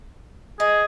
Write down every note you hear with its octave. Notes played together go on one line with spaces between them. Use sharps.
G#4 D#5